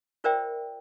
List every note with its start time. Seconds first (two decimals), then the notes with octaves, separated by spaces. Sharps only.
0.24 F4 A#4 C5 D5 E5 G5